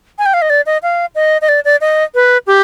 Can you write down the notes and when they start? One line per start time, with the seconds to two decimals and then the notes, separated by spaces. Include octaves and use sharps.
0.19 G#5
0.26 G5
0.34 F5
0.42 D#5
0.50 D5
0.66 D#5
0.83 F5
1.15 D#5
1.42 D#5
1.49 D5
1.65 D5
1.81 D#5
2.15 B4
2.47 G4